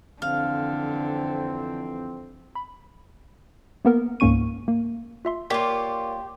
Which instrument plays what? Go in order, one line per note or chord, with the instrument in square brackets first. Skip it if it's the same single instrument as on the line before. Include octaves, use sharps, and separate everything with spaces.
[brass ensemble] F2 E3 C4 [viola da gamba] D3 [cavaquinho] F5
[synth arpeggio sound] B5
A#3 B3 A#4
C#2 G#2 A#3 C#4 C#6 D#7
A#3
[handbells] F4 E5 C6
[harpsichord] A#2 [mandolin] F4 C#5 [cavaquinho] G4 [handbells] B6